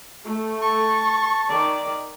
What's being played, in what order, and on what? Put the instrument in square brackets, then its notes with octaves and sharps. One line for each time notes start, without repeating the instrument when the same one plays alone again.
[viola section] A3
[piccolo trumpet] A5 [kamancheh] C#6
[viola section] D#3 D5